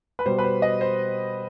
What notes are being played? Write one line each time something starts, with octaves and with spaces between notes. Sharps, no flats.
B4
B2 G3 C5
B4
C5
D#5
C5